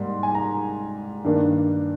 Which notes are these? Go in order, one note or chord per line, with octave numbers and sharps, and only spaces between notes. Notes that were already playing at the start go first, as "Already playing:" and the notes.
Already playing: G#2 G3 A#3 C6
G#5
A#5
G2 D#3 A#3 D4